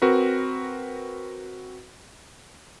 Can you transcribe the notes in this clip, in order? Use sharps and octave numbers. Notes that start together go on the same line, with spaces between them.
C4 F#4 A#4 B4